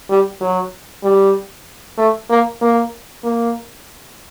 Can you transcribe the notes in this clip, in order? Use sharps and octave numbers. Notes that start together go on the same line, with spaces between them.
G3
F#3
G3
A3
A#3
A#3
A#3